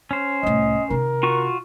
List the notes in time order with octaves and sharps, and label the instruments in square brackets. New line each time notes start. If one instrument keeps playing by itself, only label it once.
[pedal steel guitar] C#4 C5
[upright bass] C2 A2 [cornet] D#5
[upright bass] C3 D#3 [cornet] A#4
[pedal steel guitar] F4 F#4 C#6